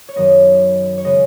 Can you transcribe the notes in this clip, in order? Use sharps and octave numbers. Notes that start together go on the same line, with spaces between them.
C#5
F#2 D#3 F#3 B3 D#5
C#5
C#3 G#3 B3 D#5